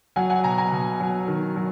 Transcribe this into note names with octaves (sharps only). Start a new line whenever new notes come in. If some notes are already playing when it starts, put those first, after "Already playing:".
F#3 F#5 G#5
F#5 G#5
B2 G#5 A#5
G#5 A#5
B2
F#3
D#3
F#3